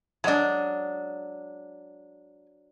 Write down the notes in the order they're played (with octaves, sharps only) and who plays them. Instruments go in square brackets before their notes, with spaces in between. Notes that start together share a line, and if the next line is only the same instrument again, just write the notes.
[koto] F#3 D4 [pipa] G#3 D#5